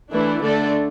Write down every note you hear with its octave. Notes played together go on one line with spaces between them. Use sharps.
E3 A3 D4 E4
D3 A3 D4 A4 D5